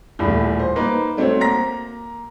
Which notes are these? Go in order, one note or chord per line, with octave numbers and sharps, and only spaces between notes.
D#1 E2 A2 B5
C5
A#3 D#4 B4 A#5
A3 C4 F#4 C5 C#5
A#3 A#5 A#6